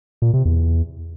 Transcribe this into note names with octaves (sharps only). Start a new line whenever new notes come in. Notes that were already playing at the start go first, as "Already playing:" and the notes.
A#2
C3
E2